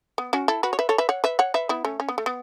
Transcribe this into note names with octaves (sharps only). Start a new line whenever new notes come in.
B3
C#4 F#4
E4 A4
F#4 B4
C#5
B4 E5
A4 C#5
B4 E5
C#5 F#5
B4 E5
C#5 F#5
B4 E5
B3 E4
A3 C#4
C#4
B3
A3
B3